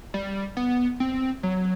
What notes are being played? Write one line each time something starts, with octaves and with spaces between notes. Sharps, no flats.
G3
B3
C4
F#3